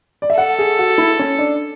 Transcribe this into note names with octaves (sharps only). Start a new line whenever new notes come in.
D5
E5
A4 F#5
G#4
F#4
E4
C#4
D4